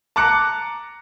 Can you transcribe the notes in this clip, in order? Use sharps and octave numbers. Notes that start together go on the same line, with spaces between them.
A5 A#5 D6 F#6 C#7